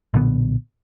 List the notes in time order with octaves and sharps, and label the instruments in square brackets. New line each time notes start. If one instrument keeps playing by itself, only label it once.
[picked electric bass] B1 A#2 D3 B3